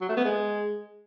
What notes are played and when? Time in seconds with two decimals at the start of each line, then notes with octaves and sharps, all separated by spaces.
0.01 F#3
0.09 A3
0.17 B3
0.25 G#3